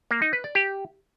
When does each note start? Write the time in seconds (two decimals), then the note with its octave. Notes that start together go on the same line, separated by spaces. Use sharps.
0.11 A#3
0.22 D#4
0.33 B4
0.44 D5
0.55 G4